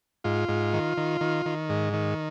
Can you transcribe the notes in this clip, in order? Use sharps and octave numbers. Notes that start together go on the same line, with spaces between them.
G#2 F4
G#2
D#3
D#3
D#3
D#3
G#2
D#3